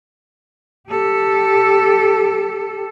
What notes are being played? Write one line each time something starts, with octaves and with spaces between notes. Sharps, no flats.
G4 A4